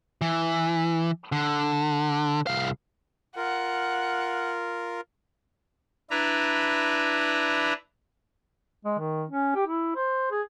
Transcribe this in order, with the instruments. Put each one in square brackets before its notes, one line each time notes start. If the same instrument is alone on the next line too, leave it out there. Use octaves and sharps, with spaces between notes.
[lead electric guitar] E3
D3
C2 F5
[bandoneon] F4 A#4 [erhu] F#5
[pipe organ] D4 E4 B4 A#5
[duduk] G#3
D#3
C#4
G4
E4
C5
G#4